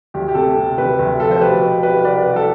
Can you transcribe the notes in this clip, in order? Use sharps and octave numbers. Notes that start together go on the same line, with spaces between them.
D2 G4
G4
C3 A4
C3
D2 G4 B4
D2
F3 A4
C5
B2 G4 B4
B2
C2 G4 B4
C2 B4 D5
C2
A4